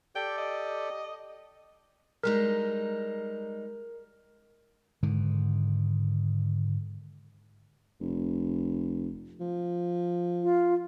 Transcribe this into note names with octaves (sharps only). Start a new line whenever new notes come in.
G4 A4 D5 G5
D#5
G3 G#3 D#4 A#4
G#2 D3 D#3
F1
F3
F4